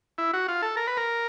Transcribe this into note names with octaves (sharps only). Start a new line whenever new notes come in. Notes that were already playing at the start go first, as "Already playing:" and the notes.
E4
F#4
F4
A4
A#4
B4
A#4